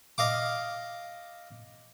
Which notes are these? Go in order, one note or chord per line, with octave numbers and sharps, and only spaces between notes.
D#5 F5 D6